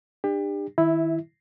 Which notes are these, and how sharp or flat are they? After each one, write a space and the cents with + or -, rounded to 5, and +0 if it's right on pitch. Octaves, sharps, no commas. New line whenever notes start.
D4 +30 G4 +30
D#3 +15 E4 +0 E5 -25